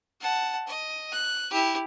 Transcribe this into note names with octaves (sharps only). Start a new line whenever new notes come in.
F#5 A5
D#5
F#6
E4 G4